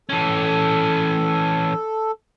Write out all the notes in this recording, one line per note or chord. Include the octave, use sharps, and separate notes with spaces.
E3 C#4 A4